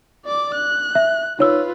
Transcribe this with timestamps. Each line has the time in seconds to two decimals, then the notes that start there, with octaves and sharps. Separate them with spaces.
0.25 D5 D6
0.54 F#6
0.95 E5
1.39 D#4 F4 B4 C#5 E6